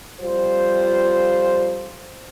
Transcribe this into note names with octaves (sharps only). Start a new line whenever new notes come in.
F2 G3 F4 C5